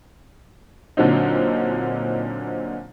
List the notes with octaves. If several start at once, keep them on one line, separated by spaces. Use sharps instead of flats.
A#2 D3 F#3 C4 D#4